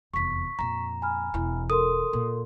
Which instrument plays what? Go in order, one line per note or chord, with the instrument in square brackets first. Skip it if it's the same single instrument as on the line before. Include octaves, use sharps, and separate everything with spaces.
[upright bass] F1 E2 [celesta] C#6 B6
[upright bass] F2 A#2 [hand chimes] A#5
[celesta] G#5 B5 F6
[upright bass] E1 E3
[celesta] A4 A#4 C6 [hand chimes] D#6
[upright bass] A#2